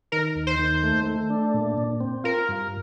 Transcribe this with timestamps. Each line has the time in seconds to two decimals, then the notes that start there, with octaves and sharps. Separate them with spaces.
0.12 D#3 A#4
0.35 D#2
0.47 C5
0.59 D#3
0.83 A3
1.06 A3
1.30 D4
1.54 A#2
1.78 A#2
2.00 C4
2.24 F4 A#4
2.49 G2